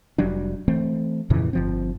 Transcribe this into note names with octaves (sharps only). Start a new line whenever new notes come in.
F1 F#3 G3 D4
E3 A3 C4
F2 A#2 C#3 E3
G1 F3 C4